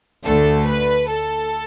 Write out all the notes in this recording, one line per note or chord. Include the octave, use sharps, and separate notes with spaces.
D2 D3 A3 A4
B4
A4